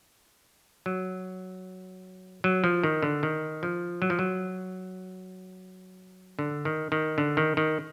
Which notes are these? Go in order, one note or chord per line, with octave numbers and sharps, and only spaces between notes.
F#3
F#3
F3
D#3
D3
D#3
F3
F#3
F3
F#3
D3
D#3
D#3
D3
D#3
D#3